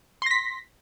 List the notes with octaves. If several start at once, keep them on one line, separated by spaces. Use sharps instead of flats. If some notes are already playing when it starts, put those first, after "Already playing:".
C6 A#6 B6